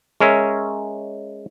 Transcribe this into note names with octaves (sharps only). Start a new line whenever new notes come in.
G#3 C#4 A#4 C#5 E5